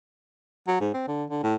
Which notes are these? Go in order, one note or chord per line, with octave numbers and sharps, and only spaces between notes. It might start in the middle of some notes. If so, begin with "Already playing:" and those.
F#3
G#2
C4
D3
D3
A2